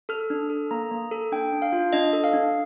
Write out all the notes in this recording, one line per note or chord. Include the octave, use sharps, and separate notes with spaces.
A4 F6
D4
A4
A#3 A#5
A#3
A4
D4 G5
D4
F5
F4
D4 D#5
A4
F5
D4